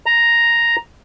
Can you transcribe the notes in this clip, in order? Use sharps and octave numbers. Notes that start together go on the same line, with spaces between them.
A#5